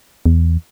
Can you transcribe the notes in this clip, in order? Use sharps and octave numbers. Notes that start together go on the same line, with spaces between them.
E2